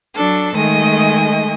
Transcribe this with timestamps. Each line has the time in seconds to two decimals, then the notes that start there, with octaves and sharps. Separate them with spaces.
0.15 F#3 D4 A4
0.53 D#3 G#3 A3 D#5 G#5